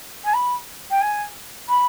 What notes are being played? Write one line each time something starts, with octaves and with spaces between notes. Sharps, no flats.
G#5
B5
G5
G#5
B5